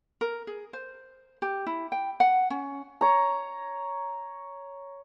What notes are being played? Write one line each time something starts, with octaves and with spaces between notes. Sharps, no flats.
A#4
G#4
C5
G4
E4
G5
F#5
C#4
C#5 A#5